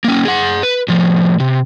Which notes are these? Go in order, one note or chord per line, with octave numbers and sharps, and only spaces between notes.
A#3 C#4
G#4 F#5
B4
A2 F3
C3